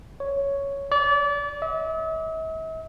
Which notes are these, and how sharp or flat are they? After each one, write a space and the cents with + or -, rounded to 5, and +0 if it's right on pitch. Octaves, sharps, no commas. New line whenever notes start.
C#5 +5
D5 -30
E5 -45